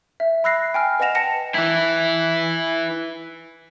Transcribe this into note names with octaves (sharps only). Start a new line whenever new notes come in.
E5
B5 E6 F#6 A#6 C7
G5 G#5 F6
B4 D#5 F#5 A#6 E7 F7
G5 A5 A#6 C#7 E7
E3 E4